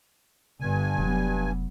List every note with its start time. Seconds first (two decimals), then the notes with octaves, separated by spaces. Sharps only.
0.60 G1 G2 G#5
0.99 F1 F#3 B3